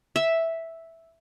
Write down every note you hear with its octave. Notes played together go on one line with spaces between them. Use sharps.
E5